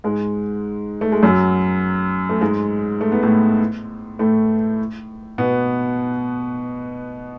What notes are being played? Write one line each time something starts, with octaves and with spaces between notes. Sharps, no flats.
G#2 G#3
A3
G#3
F#2 F#3
A3
G#2 G#3
A3
B3
A2 A3
A2 A3
B2 B3